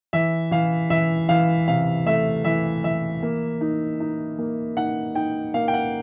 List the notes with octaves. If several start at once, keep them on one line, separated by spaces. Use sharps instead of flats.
E3 E5
E3 F5
E3 E5
E3 F5
C3 F5
A3 E5
E3 E5
E3 E5
A#3
D#4
D#4
A#3
D#4 F#5
D#4 G5
A#3 F5
G5
F#5